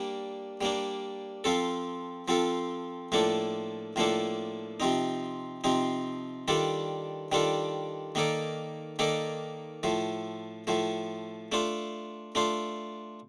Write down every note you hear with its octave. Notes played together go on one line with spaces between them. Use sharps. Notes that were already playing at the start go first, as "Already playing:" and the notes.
Already playing: G3 A#3 D4
G3 A#3 D4
F3 C4 F4 A4
F3 C4 F4 A4
A2 F3 A#3 D4 A4
A2 F3 A#3 D4 A4
C3 F3 C4 D#4
C3 F3 C4 D#4
D#3 G3 D4 F4 A4
D#3 G3 D4 F4 A4
D#3 A#3 D#4 A4 D5
D#3 A#3 D#4 A4 D5
A2 F3 A3
A2 F3 A3
A3 D4 F4 C5
A3 D4 F4 C5